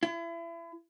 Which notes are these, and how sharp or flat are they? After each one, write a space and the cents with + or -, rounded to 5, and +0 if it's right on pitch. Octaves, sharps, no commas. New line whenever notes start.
E4 +35